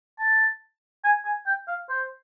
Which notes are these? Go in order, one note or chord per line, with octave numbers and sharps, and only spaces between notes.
A5
G#5
G#5
G5
F5
C5